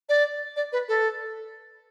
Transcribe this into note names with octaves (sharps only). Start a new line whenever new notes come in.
D5
D5
B4
A4